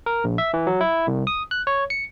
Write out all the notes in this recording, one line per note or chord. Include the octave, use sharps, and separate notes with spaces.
A#4
A#1
E5
E3
F#3
E4
C2
D#6
F#6
C#5
C#7